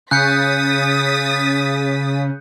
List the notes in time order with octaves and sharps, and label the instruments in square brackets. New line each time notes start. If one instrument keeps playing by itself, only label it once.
[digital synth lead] C#3 [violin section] D#6 A6 B6 [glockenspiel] F#6 G6 C#7